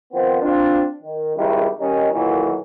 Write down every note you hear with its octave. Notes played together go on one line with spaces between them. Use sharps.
D#3 F3 B3 C4 C5
C4 D4 F4
D#3
G#1 C#2 D#3 G3 E4
D#3 G3 C#4 D#4
B1 A#2 D#3 E3 F#3